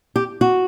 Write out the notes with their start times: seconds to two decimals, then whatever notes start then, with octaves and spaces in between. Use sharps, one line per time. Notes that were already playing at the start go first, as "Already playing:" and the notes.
0.16 G4
0.41 F#4